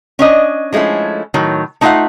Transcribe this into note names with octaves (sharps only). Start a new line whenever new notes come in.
C#4 D4 D#5
F3 G#3 A3 C#4 E4
A2 D#3 F#3
A3 D#4 F4 D5 E5 F#5